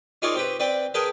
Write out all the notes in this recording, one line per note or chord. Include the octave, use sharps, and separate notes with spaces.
D#4 F4 G#4 A#4 C#5 D5
C4 G4 B4
C4 B4 D5 G5
G#4 A#4 B4 G5 A5